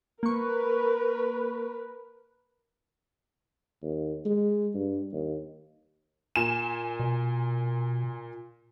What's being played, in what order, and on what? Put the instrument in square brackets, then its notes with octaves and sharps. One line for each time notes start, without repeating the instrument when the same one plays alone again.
[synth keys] A#3 C#6 [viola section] A#4 B4
[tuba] D#2
G#3
G2
D#2
[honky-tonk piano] A#2 G#5 E7
[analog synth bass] B2